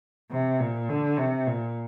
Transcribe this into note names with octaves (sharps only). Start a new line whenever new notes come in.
C3
A#2
D3
C3
A#2